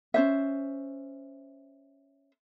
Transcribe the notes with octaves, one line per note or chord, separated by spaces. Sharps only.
C#4 D4 C5 E5